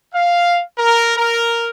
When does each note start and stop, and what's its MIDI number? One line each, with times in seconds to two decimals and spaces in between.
0.14 0.61 77
0.78 1.15 70
1.17 1.69 70